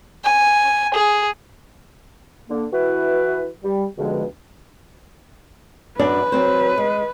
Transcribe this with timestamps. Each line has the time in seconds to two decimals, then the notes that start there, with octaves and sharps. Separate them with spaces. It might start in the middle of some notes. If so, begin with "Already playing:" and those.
0.24 G#5
0.94 G#4
2.49 D3 A#3
2.72 E3 E4 F#4 B4
3.62 G3
3.97 C#2 G2 B2 D3 F3 G#3
5.99 F#2 D4 B4 D5
6.32 F#3 C4 C5
6.78 G#3